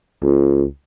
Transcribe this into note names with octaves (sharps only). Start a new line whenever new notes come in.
C#2